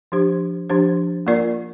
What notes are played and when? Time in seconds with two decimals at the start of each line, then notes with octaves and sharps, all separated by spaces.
0.12 F3 D4 G4 C5
0.70 F3 D4 G4 C5
1.27 A#3 F4 A#4 D5